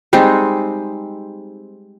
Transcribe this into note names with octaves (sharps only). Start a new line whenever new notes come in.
G3 G#3 C4 D#4